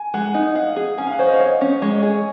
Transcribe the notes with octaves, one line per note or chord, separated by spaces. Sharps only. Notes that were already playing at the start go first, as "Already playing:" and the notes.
Already playing: G#5
G#3 F#5
D#4
F5 F#5
G#4
C#4 G#5
F5
F#5
C5 C#5
D#5
F5
C#5 D#5
C#4
G#3 C#5
D#5
C#5
G#4